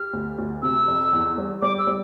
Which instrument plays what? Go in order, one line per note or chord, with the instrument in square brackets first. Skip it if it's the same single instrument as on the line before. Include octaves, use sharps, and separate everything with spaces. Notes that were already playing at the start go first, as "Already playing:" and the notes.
Already playing: [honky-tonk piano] G4 [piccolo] F6
[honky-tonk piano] D2
D2
[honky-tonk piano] C3 [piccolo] E6
[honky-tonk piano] F2
E2
G3
[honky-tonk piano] G3 [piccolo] D6
[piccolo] E6
[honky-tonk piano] G3